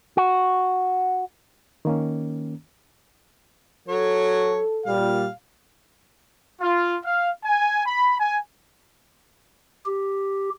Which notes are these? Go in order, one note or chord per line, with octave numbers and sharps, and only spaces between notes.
F#4
D#3 A#3 C#4
F#3 A4 C#5
A#2 G3 F5
F4
F5
G#5
B5
G#5
G4